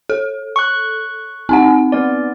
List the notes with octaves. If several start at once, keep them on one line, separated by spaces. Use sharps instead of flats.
A4
C#6 F#6
C4 D#4 F#5
B3 D5